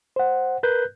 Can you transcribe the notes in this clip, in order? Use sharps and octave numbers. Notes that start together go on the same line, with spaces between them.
C5 F#5
A#4 B4 F#6 G6